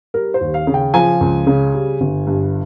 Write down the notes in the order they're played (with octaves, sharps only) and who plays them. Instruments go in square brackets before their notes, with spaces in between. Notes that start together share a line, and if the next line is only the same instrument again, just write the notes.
[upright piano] G3 A#4
C5
D#2
F5
C#3
G5
F3 G#5
C#2
C#3
G3
G1
G2